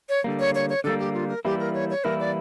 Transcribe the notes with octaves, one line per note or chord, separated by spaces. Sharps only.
C#5
D3 G3 A#3
C#5
C#5
C#5
D3 G3 A#3 A4
G4
F4
A#4
E3 G3 A#3 E4 G4
A#4
C#5
C#5
E3 G3 A#3 E4 A#4
D5